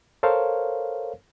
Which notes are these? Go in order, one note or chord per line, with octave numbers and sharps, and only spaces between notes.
A4 A#4 C5 C#5 F5